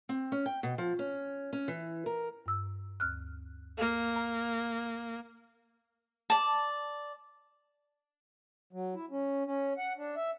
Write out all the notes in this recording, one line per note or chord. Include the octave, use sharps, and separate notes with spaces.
C4
C#4
G5
B2
F3
C#4
C#4
E3
A#4
G2 E6
D2 F6 F#6
A#3 F5
A#5
D5 A5
F#3
E4
C#4
C#4
F#5
D4
E5